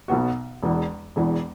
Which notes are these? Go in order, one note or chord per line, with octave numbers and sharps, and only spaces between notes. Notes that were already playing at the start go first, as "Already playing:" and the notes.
B1 B2 F#3 B3 F#4
E1 E2 E3
E1 E2 E3